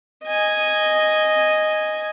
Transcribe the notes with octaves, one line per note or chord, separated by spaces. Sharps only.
D#5 G#5